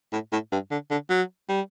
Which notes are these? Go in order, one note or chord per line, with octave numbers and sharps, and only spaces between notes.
A2
A2
G2
D3
D3
F#3
G3